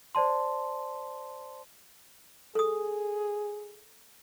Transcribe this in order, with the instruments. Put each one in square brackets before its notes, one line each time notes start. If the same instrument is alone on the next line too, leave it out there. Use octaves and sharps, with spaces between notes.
[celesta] C5 D5 A5 C6
[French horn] G#4 [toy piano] A4 D#6